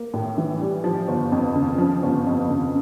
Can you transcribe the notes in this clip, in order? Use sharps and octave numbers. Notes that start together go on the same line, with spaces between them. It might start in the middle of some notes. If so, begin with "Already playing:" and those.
Already playing: A#3
A2
E3
G3
F3
G1
F2
C#3
F3
G1
F2
C#3